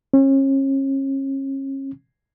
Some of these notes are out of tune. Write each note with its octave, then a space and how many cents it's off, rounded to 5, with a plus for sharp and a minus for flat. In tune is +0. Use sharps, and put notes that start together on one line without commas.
C#4 -35